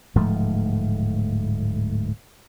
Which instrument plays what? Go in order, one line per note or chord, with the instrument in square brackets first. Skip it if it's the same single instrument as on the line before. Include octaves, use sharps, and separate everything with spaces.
[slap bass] D1 G#2 F3 A3